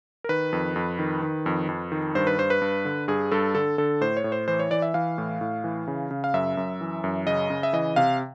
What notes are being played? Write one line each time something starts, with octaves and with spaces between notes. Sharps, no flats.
A#4
D#3 B4
F2
F2
D#3
D#3
F2
F2
D#3
G2 C5
B4
G2 C5
B4
G2
D3
G2 G#4
G2 A4
D3 A4
D3 A4
A2 C5
C#5
A2
C5
E3 C5
C#5
E3 D5
E5
E3 F5
A2
A2
E3
C#3
C#3
F5
F#2 E5
F#2
E3
F#2
C#3 D#5
C#3
E5
E3 D#5
C3 F5